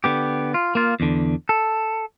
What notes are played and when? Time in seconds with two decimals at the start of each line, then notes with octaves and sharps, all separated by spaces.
0.04 D3 B3 G4
0.54 F4
0.75 A#3 F4
1.00 E2 D3
1.49 A4